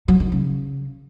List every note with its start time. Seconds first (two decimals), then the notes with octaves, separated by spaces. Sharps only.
0.08 F#3
0.20 D#3
0.32 C#3